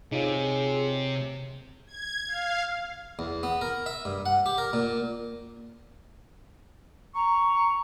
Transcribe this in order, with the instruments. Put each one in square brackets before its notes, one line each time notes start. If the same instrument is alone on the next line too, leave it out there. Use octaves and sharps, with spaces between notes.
[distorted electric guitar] C3 [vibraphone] C4 C#5 [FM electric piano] D#4 F4 [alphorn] G#4
[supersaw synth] G#6
F5
[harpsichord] E2
B3
A#4
E5
G2
F#5
G4
A#4
A#2
[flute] A#5 [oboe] C#6